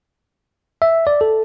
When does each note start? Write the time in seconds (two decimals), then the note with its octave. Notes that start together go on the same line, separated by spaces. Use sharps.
0.82 E5
1.07 D5
1.21 A4